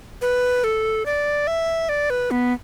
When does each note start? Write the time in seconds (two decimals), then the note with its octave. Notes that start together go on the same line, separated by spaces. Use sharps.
0.22 B4
0.64 A4
1.06 D5
1.47 E5
1.89 D5
2.10 B4
2.31 B3